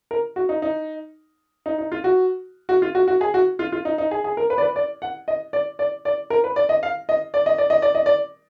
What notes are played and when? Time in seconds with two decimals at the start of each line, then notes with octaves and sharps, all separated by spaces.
0.11 A#4
0.36 F#4
0.49 D#4
0.62 D#4
1.66 D#4
1.78 D#4
1.92 F4
2.04 F#4
2.69 F#4
2.82 F4
2.95 F#4
3.08 F#4
3.21 G#4
3.34 F#4
3.59 F4
3.72 F4
3.85 D#4
3.98 D#4
4.11 G#4
4.24 G#4
4.37 A#4
4.50 B4
4.58 D5
4.62 B4
4.76 D5
5.02 F#5
5.28 D#5
5.53 D5
5.79 D5
6.05 D5
6.30 A#4
6.44 B4
6.56 D5
6.69 D#5
6.83 F5
7.09 D#5
7.34 D5
7.46 D#5
7.58 D5
7.70 D#5
7.82 D5
7.95 D#5
8.06 D5